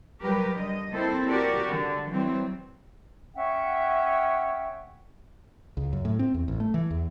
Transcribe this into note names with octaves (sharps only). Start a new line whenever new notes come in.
F#3 G3 G4 A#4 B4
D3 D#5
A#3 C4 E4 A4 C5
F#4 G4 A#4 D5
D3
E3 F#3 G3 C4
C#4 E5 F#5 G5
C#2
F#2
A2
C4
E2
A1
A3
E3
E2